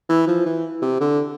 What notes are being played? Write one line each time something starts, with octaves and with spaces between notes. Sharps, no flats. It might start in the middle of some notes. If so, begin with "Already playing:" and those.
E3
F3
E3
C3
D3